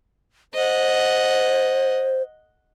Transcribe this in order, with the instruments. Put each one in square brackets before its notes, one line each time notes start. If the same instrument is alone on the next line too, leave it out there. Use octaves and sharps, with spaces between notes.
[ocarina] C5 [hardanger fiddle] D#5 F#5